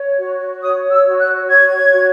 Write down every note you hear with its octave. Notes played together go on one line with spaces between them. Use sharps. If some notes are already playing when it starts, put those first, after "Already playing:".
Already playing: C#5
F#4
C#5 D#6
E6
F#4
F#6
C#5 G#6
F#4